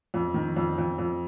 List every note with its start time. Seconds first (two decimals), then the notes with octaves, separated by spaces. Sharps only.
0.14 F2
0.34 D#3
0.56 F2
0.78 F2
0.98 F2